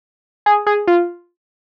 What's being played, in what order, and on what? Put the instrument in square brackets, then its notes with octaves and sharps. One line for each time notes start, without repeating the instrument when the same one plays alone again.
[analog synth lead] G#4
G#4
F4